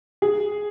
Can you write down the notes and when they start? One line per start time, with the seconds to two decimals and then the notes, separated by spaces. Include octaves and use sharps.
0.22 G#4